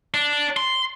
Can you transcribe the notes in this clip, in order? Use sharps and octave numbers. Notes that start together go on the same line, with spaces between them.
D4
C6